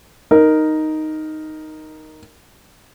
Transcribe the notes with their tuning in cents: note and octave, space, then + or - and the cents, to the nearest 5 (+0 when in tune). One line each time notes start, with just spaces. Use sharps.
D#4 +0 A#4 +0